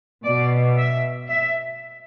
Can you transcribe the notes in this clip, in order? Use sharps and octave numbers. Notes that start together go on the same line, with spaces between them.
B2 D5
E5
E5